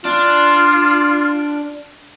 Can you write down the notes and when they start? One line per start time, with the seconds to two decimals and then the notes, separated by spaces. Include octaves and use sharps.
0.05 D4 F4